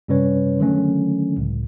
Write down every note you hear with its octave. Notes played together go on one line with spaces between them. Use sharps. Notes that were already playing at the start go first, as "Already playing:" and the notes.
F#2 C3 G3 C#4 B4 C#5
D3 D#3 F#3 A3 C#4
C#2 A2